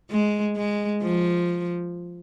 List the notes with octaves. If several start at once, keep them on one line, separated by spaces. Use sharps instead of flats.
G#3
G#3
F3